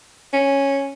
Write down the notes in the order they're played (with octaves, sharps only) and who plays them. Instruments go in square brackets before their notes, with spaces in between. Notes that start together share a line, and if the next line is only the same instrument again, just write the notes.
[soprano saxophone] C#4